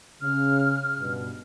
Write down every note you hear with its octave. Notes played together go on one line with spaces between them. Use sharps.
C#3 F6
G2 B2